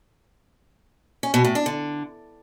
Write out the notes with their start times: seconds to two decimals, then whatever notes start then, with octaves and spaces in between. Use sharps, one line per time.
1.23 C#4
1.34 B2
1.45 A2
1.55 D4
1.66 D3